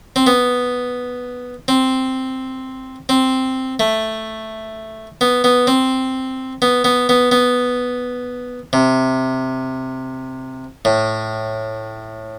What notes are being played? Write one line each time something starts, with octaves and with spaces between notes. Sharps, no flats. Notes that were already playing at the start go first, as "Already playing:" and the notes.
C4
B3
C4
C4
A3
B3
B3
C4
B3
B3
B3
B3
C3
A2